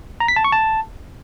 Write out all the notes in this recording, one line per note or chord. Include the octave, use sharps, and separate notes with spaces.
A#5
B6
A5
C#6
A5